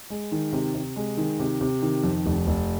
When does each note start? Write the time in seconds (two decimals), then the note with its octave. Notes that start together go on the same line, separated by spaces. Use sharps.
0.10 G#3
0.32 D#3
0.53 C3
0.75 C3
0.96 G#3
1.17 D#3
1.39 C3
1.61 C3
1.82 D#3
2.04 F2
2.26 F1
2.47 F1